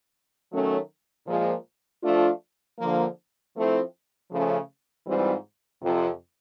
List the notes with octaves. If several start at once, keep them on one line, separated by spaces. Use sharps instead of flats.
D#3 F#3 A3 C#4
A#2 F3 G#3
F3 A3 D4 F4
D3 F3 A#3
F3 A3 C4 E4
C#3 F3 A3 C#4
G#2 E3 G3 C4 F4
F2 C3 F3